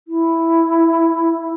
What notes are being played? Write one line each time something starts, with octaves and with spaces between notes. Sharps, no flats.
E4